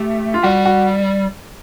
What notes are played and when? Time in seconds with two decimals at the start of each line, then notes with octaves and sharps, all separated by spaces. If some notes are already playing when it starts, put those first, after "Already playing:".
Already playing: A3 G4
0.34 F4
0.43 G3 F#4
0.65 F#4